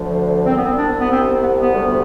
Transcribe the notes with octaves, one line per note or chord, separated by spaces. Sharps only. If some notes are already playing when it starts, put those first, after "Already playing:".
Already playing: D2 D3 F3
C2 C3 G3 C4
B3
C4
D4
B3
C4
B3
B3
D2 C3 G3